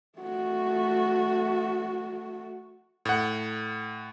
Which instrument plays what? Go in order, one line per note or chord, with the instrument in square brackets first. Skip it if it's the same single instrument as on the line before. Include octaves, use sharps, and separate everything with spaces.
[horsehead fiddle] A3 F#4
[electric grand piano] A2 F#5